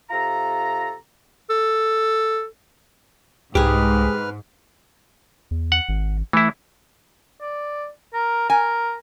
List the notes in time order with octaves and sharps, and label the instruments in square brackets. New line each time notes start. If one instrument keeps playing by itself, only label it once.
[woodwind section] C3 F4 A4 A#5
[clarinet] A4
[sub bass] C2 [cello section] G#2 [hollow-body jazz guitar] G4 G#4 [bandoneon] B4 F6
[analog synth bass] E2
[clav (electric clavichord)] F#5
[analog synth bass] G#1
[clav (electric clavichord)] E3 E4 [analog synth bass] A3
[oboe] D5
A#4
[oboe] A#4 [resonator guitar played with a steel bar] G#5